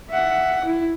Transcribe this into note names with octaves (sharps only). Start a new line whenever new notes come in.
E5 F#5
E4